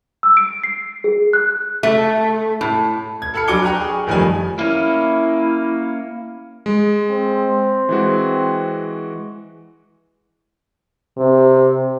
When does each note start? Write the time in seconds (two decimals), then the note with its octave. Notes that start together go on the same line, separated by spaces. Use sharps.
0.23 E6
0.37 D7
0.64 C7
1.04 G#4
1.33 F#6
1.83 A3
2.61 A2
3.22 G#6
3.34 A4 A5 B5 F6 C#7
3.48 F#3 D4 G#5 D6 C#7 G7
3.63 G5 G#5 A#5 B5 C#6 F#6
3.81 G#4
4.07 F#1 D#3 F3 G3 A3 G#5
4.59 A#3 C#4 E4
6.66 G#3
7.10 C4
7.89 E3 G#3 F#4
11.17 C3